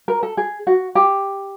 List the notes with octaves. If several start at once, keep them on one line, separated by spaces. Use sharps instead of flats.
A#4
A4
G#4
F#4
G4